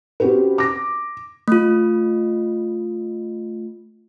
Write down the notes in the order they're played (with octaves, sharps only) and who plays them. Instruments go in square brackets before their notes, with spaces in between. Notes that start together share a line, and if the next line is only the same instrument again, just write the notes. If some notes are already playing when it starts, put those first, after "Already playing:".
[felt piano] C4 C#4 F#4 G4 B4
D6 A#6
[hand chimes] A3 F4